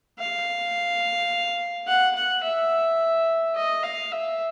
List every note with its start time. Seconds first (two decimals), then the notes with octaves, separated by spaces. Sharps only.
0.19 F5
1.87 F#5
2.15 F#5
2.43 E5
3.55 D#5
3.83 F5
4.12 E5